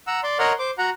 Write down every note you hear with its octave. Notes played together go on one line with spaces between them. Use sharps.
F#5 A#5 E6
D5 C6
A#4 C#5 D#5 F#5 C6 F6
C5 D6
F#4 F#5 A#5